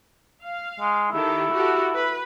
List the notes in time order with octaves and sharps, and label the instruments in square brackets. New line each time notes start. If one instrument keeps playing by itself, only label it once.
[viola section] F5
[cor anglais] G#3
[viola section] D#3 G4 A4 [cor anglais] E4
[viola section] F#4 G4 A4
B4